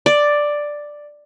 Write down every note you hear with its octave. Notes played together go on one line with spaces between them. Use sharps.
D5